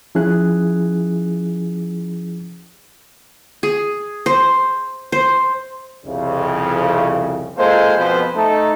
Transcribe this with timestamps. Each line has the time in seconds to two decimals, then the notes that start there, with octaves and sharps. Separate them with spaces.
0.15 F3 C#4 E4 G#4 F#6
3.63 G#4
4.26 C5
5.12 C5
6.05 C2 F2 C#3
7.57 G#3 A#3 F4 A4 C5
7.97 F2 B2 F3 B3 B4 C5
8.35 A3 D#4 A4